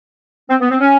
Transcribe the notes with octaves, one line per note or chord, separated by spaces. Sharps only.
C4
B3
C4
C#4